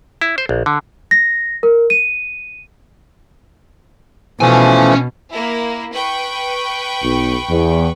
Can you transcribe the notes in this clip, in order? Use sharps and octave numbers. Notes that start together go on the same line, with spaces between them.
E4
C5
A#1
D3
A#6
A#4
D#7
B2 E3 F3 A3 C#4 G#5
A#3 E4
B4 G5 C#6
B1
E2